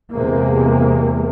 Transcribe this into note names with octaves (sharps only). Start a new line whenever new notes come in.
E2 C3 G#3 A#3